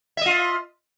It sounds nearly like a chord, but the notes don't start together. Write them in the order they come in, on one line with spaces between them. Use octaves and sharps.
E5 D#5 F4